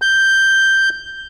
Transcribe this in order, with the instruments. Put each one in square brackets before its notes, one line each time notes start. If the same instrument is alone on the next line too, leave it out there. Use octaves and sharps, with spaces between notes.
[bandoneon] G6